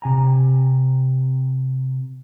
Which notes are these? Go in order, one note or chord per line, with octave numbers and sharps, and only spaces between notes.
C3 G#5 A#5